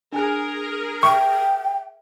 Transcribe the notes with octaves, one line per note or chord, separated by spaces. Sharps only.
D4 G#4 A#4 G#5 F#6
E5 G5 C#6